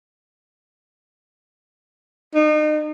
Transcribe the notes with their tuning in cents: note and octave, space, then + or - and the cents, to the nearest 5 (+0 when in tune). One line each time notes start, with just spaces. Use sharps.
D#4 -35